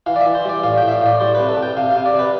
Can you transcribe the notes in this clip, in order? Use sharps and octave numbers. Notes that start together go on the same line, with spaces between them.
E3 F5
D5
E5
E3
C5
G3 D5
A2 F5
A2 G5
E5
F5
A2 D5
G3 C5
C3 B4
A4
C3 G5
C3 F5
F5
C3
D5
C3 B4